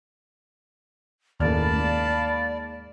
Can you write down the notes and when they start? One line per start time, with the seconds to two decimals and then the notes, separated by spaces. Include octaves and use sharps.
1.40 F#1 D#2 A2 D5 F5 A5 B5 F6
1.76 G#2 A#3